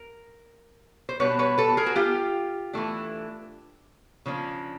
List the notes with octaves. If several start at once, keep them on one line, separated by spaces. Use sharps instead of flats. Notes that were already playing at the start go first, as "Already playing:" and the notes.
Already playing: A#4
C5
B2 G3 B3 D4 B4 C#5
B4 C#5
A4 B4
G#4 A#4
F#4
F4 G4
E3 A3 D4
C#3 F3 A#3 D4